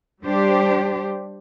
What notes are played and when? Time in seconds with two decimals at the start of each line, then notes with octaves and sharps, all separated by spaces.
0.22 G3 D4 G4 C5